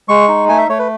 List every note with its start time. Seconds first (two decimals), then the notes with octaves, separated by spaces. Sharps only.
0.08 G#3 C#6
0.28 D#4
0.48 A3 G#5
0.58 E5
0.69 A3 C#5
0.79 B4